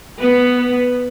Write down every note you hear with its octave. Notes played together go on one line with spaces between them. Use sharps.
B3 B4